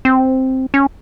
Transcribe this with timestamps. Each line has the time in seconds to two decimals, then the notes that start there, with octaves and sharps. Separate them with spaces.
0.05 C4
0.74 C#4